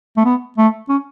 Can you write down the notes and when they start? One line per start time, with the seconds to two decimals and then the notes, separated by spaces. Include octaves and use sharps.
0.17 A3
0.25 B3
0.58 A3
0.89 C#4